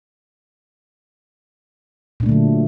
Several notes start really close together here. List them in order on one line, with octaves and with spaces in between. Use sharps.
A#2 D4 A3 D3 F#3